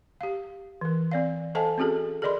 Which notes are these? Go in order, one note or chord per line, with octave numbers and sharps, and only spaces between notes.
G4 F5
E3 A#4
C4 D5 F5
A4 C5 D#5 F5 G#5 A5
C4 C#4 F#4 G#4 A4
G#4 A#4 D5 D#5 B5 C6